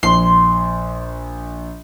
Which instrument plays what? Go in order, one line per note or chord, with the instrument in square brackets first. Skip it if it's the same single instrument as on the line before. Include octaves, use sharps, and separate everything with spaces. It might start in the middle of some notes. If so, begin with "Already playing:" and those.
[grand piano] A#1 [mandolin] C6